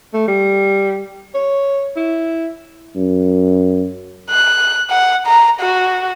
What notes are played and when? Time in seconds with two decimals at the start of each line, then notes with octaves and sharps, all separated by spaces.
0.13 A3
0.28 G3
1.34 C#5
1.96 E4
2.96 F#2
4.30 F#6
4.90 F#5
5.27 A#5
5.61 F#4